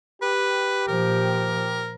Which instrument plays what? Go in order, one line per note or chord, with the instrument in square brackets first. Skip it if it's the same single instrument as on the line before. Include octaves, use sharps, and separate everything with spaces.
[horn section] G4 [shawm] B4
[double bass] A#2 F3 [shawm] A#4